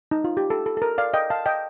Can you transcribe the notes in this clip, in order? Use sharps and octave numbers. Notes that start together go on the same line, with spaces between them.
D#4
F4
G4
A4
A4
A4
A#4
D5 F5
D#5 G5
F5 A5
D#5 G5